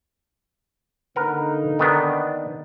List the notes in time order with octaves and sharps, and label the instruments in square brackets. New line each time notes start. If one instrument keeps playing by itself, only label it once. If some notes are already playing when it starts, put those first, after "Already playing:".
[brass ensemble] D3 A#3 D#4 [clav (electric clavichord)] A#4 B4 F#5
[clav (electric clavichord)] D#3 B3 D4